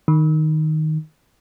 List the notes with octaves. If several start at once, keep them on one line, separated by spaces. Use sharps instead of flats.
D#3